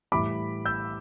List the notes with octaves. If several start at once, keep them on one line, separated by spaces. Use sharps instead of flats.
A2 E3 G3 B5 D6
E6 G6